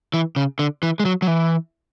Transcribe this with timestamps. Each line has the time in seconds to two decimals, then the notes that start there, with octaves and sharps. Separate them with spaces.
0.14 E3
0.36 C#3
0.59 D3
0.83 E3
1.00 G#3
1.05 F#3
1.22 F#3
1.27 E3